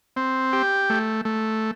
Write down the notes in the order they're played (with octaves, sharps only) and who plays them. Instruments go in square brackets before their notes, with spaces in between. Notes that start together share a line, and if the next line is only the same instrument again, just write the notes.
[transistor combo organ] C4
G4
A3
A3